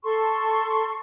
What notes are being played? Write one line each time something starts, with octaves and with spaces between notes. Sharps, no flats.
A4 C6 C#6